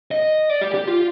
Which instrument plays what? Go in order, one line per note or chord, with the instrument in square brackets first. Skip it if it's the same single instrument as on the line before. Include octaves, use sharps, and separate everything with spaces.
[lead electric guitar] D#5
D5
G4
G4
F4